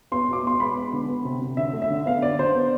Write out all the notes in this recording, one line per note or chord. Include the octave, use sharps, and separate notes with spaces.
B3 C6
B2 D6
B2 C6
G#3 B5
B3
D3
B3
C3
C3
D3 E5
A3
E5
D3
B3 F5
D3 D5
D3 C5
B3